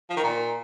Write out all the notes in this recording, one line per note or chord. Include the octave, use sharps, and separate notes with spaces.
F3
D#3
A#2